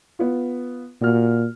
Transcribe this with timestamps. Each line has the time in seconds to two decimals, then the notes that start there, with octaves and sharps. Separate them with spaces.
0.19 B3 F4
1.02 A#2 F#4 F6